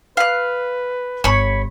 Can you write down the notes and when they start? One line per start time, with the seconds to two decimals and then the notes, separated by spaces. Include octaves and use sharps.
0.17 B4 F5 F#6
1.24 G1 C#5 B5